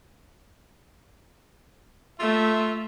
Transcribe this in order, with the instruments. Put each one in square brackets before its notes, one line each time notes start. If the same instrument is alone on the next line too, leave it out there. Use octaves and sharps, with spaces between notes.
[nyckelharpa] A3 [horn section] F4 E5